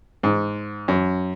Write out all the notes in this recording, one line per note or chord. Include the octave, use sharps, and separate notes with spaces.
G#2
F#2